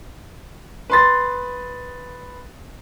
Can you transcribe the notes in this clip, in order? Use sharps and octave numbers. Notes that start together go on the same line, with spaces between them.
B4 C6 A6